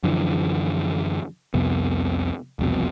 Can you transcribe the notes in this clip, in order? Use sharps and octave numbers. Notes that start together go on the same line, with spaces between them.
F#2 D3 E3 F3
C2 F2 C3 B3
E1 C2 F2 B2